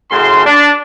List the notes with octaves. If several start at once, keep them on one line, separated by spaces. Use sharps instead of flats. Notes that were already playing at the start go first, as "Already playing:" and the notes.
F#2 A2 C#3 C6
D4